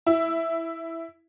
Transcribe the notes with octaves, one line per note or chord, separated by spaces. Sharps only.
E4